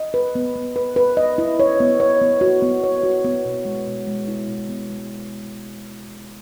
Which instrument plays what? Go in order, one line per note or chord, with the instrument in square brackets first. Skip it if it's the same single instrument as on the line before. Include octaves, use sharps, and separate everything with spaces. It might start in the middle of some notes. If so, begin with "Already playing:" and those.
Already playing: [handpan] D#5
B4
B3
B3
B4
B4
D#5
E4
C#5
B3
C#5
B3
F#4
B3
C#5
F#4
B3
B2
G#3
B2
G#3
E4
B2
B3
G#3